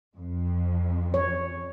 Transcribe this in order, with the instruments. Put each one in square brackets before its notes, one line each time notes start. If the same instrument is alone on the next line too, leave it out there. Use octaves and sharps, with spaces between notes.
[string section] F2
[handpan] C#5